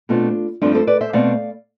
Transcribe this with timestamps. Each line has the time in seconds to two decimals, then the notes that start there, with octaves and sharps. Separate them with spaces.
0.09 B2 A3 C4 D4 F4
0.61 G2 F3 A3 C4 D4 F4
0.75 A4 C5
0.87 B4 D5
1.01 C5 E5
1.13 B2 A3 C4 D5 F5